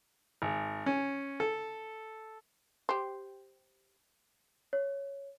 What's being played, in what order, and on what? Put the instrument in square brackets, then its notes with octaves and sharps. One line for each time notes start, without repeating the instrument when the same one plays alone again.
[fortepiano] G#1
C#4
A4
[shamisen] G4 C5
[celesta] C#5